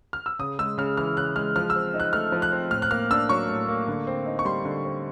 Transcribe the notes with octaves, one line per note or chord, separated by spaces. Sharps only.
F6
E6
C#3 D#6
G#3 E6
C#3 F6
E3 F6
C#3 F#6
G#3 F6
F3 F6
E6
C4
D#4
F#6
A3 F6
F3
F#6
C4
A2 F6
F#6
A#3 F6
D4 E6
F#3 C#6
A2
A#3
D3
C4
D#4
C#6
G3 C6
D3
C4